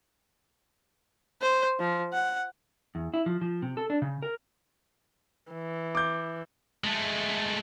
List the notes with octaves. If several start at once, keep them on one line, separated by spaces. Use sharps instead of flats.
C5
F3
F#5
E2
E4
F3
F3
C3
A4
D4
C#3
A#4
E3
D6 G6
G#3 A3